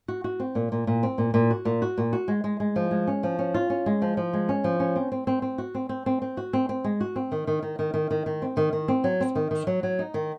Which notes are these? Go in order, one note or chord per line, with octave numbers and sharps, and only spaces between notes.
F#4
F#4
C4
A#2
A#2
A#2
C4
A#2
A#2
F#4
A#2
F#4
A#2
F#4
G#3
G#3
G#3
F3
G#3
C#4
F3
C#4
F4
C#4
G#3
F3
F3
G#3
C#4
F3
C#4
C4
C4
C4
C4
F#4
C4
C4
C4
C4
F#4
C4
C4
G#3
F#4
C4
D#3
D#3
D#3
D#3
D#3
D#3
D#3
C4
D#3
D#3
C4
F#3
C4
D#3
D#3
F#3
F#3
D#4
D#3